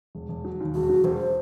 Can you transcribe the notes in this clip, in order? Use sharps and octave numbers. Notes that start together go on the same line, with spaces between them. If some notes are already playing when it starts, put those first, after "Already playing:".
E1
E1
F#3
D#2
E1 F#4
F#3
E1 C5